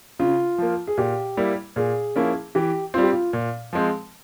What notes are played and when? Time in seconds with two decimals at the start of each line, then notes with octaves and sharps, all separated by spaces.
0.19 C#3 F4
0.58 F3 A#3
0.87 G#4
0.97 A#2 G4
1.37 G3 A#3 E4
1.76 A#2 G#4
2.16 F3 A#3 C#4 E4
2.55 E3 G4
2.94 G3 C4 F4
3.03 G4
3.13 F4
3.33 A#2
3.73 F3 G#3 C4